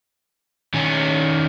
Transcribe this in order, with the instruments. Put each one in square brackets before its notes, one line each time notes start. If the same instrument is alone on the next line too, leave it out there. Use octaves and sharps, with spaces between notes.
[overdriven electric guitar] D#3 C#4